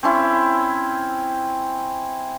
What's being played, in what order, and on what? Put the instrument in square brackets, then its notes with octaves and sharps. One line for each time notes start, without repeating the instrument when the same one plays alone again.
[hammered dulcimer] C4 C#4 E4